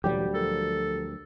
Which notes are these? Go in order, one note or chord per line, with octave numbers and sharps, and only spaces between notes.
D2 A#2 E3 F#3 G3 G4
F3 A4 A#4